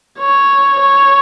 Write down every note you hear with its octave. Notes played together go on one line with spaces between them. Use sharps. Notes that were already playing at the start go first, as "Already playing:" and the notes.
C#5
C#5